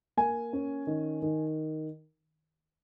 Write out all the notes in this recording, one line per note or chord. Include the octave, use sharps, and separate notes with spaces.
A#3 G#5
C#4
D#3
D#3